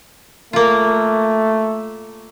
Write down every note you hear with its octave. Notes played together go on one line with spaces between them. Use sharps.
A3 A#3 F4